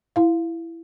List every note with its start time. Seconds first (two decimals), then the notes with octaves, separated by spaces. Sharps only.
0.16 E4 F5